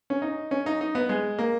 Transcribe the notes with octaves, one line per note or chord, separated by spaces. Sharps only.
C#4
D#4
C#4
D#4
D#4
B3
G#3
A#3